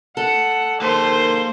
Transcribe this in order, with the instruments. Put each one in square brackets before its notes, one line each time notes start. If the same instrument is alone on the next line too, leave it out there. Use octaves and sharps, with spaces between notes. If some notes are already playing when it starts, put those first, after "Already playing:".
[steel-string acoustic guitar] A4 [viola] F#5
[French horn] D#3 [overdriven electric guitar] A#3 A5 [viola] C5